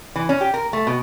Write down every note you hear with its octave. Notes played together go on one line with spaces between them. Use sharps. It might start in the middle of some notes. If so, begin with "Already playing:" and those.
E3
C#4
G4
A#4
A3
B2